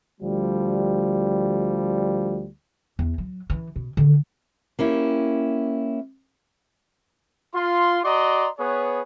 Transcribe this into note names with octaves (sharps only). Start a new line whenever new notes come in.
D2 F3 G3
E2
F#3
E3
B2
D3 D#3
A#3 C#4 E4 G4
F4 C6
F#4 D5 D#5 A#5 C6 D6
B3 G#4 B4 C#5